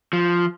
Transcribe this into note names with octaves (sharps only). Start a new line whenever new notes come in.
F3